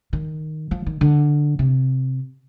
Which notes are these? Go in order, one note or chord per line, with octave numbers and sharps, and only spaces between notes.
D#3
F3
D#3
D3
C3